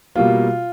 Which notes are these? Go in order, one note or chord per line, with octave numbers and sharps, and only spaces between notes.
B2 G3 A#3 F4